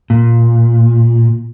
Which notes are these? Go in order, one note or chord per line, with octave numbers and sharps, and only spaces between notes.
A#2